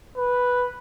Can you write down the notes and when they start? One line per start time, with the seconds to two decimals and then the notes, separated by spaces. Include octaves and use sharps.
0.17 B4